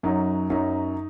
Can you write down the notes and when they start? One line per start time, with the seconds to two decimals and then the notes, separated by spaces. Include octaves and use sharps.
0.03 F#2 F#3 D#4
0.50 F#2 F#3 D#4